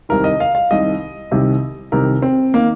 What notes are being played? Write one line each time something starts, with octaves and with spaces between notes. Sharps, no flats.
C2 C3 D#3 A#4
D#5
F5
F5
C2 C3 D#3 D#5
C2 C3 D#3
C2 C3 D#3 A#4
C4
D#3 A#3